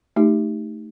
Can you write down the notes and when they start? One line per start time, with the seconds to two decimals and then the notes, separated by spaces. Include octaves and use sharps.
0.16 A3 D#4 G4